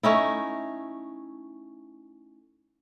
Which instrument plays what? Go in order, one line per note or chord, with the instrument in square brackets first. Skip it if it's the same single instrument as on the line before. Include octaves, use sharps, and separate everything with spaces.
[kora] A3 C#4 D#4 E4